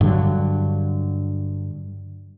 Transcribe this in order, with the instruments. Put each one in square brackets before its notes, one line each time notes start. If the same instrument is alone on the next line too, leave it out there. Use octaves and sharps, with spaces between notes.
[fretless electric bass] G2 D3 F#3